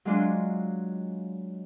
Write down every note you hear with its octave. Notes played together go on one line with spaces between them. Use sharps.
F#3 G#3 D4 F4